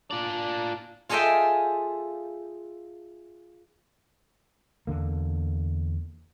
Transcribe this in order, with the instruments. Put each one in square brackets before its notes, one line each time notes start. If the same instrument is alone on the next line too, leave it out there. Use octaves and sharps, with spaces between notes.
[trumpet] D4 [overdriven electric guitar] F4 D5
[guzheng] F4 G#4 A4 D#5 E5 G5
[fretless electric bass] E2 D3 A#3